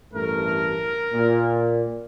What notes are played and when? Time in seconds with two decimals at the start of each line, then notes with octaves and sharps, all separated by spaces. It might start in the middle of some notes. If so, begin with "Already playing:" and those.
0.13 A1 G2 A3 A#4
1.13 A#2